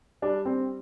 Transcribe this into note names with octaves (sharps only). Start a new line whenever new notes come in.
G3 D4
C4